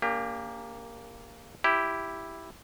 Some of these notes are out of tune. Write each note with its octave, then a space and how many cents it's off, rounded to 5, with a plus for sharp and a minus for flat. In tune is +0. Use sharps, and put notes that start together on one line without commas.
A#3 +0 D4 -45 G4 +30
E4 +0 G4 +0